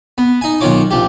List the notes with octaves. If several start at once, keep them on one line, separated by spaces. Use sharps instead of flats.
B3
D#4 G#5
B1 D#3 F4 C#5 D6
A#1 F3 G4